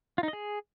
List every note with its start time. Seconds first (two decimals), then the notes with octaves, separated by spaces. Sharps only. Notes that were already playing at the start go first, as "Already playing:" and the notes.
0.18 F4
0.23 D#4
0.28 D#5
0.33 G#4